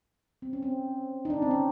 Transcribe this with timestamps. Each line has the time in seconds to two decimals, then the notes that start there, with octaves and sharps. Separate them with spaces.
0.42 C4
0.53 C#4
0.63 C4
1.25 D#4
1.30 D4
1.42 C4
1.51 C#4